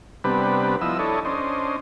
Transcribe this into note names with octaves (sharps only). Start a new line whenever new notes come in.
C3 G3 B3 D4 B4
F3 B3 E4 D#5 E6
D4 E4 A4 C#5 D#5
C#4 D4 C5 D#5